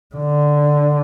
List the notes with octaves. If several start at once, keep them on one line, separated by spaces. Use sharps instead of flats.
D3